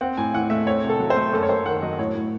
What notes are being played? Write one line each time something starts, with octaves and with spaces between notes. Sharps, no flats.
C4 F#5
A2 G#5
E3 F#5
A3 E5
C4 C#5
C3
A4
F#3
C5
A3
F#2 A4
C#5
F#2 C5
D#3 F#5
F#3 D#5
A2 C#5
A2